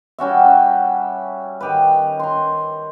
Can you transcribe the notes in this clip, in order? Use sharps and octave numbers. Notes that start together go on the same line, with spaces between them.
G3 C#4 F#4 E5
D#3 G4 B4
A#5 C6